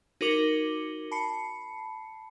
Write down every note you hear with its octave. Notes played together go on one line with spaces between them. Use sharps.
D#4 F#4 A#4 D6 C#7 G7
A5 B5 C7 C#7